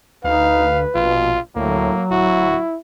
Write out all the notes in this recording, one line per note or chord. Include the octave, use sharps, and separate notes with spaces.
D2 D#4 B4 F5
A#1 B2 F4
D2 A2 F#3 A#3
D1 E4 F#4